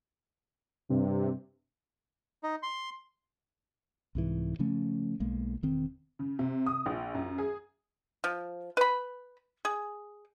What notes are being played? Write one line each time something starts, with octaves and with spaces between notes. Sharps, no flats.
G2 C3
D#4
C6
C2 G#2 E3
C#3 F3 A3 C#4
B1 G#3 A#3
E1 D#3 C4
C#3
C3
D#6
A#1
F#2
G#4
F3
B4 B5
G#4